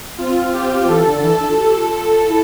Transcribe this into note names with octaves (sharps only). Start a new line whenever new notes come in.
C4 F4
G4
E3 A4
D3
E3 A4
D4
F4
G4
F4
E4